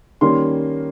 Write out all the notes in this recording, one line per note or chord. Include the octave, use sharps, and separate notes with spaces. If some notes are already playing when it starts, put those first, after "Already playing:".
D#3 G3 A#3 C#4 C6